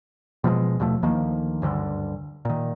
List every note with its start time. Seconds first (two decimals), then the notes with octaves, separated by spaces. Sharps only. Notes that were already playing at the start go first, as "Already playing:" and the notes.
0.44 B2 F3 F#3 G#3
0.80 D#2 B2 F3 A3
1.02 D2 D#3 F3 A#3
1.62 F#1 D2 G2 D3
2.45 A#2 D#3